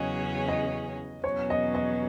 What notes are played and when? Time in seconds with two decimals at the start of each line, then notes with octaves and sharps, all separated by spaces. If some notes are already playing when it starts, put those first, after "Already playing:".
Already playing: E2 C#3 F#3 C#4 G#4 D#5
0.48 D#5
1.24 E2 B2 F#3 C#4 C#5
1.50 D#5
1.75 D#5